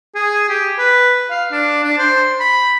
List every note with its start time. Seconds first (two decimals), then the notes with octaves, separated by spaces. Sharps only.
0.15 G#4
0.49 G4
0.79 B4
1.30 F5
1.52 D4
1.84 D4
1.98 C5
2.40 B5